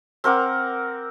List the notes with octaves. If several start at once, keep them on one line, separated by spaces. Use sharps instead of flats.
C4 A#4 F#5 D6